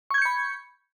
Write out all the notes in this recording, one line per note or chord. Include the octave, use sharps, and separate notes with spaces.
B5 C#6 G6 G#6 C#7